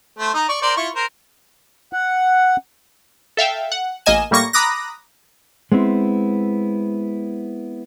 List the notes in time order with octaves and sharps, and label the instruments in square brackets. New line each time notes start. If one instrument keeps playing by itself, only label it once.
[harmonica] A3 C5
D#4 A#5
D5 C#6
A#4 C5 D5
E4 F4 C#6
A#4 C5
[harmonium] F#5
[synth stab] A4 E5 F5 G5
F#5
A1 A#3 D#5 G#5 E7
A2 G3 A#3 C#6 A#6
A#5 B5 D6 D#6 F#6 A#6
[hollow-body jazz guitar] G#3 B3 C4 E4